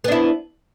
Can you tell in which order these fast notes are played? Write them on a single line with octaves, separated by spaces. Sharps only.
B3 D4 E4